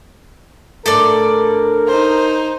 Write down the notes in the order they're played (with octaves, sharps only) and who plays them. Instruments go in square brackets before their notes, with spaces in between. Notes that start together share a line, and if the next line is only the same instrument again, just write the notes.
[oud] A2 D3 A3 [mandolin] A4 D5 [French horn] A#4
[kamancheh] D#4 C5